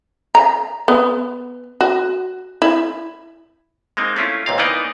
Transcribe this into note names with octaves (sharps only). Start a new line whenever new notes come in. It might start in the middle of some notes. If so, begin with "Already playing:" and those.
A#5
B3
F#4
E4
G#3 A#3 C4 D#4
A3 C#4 E4 F4
G#1 C#2 A#2 C4 F5
E3 A#3 B3 D#4 D5 D#5